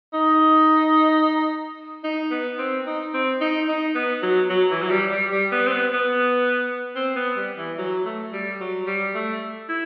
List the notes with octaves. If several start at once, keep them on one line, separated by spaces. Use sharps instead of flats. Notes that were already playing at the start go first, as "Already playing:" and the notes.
D#4
D#4
B3
C4
D#4
C4
D#4
D#4
B3
F#3
F#3
E3
F#3
G3
G3
G3
B3
C4
B3
B3
C4
B3
G3
E3
F#3
A3
G3
F#3
G3
A3
E4